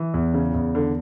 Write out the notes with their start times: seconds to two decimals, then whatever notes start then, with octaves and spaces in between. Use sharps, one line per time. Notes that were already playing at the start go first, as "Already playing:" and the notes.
Already playing: E3
0.14 E2
0.34 C#3
0.54 E2
0.75 D3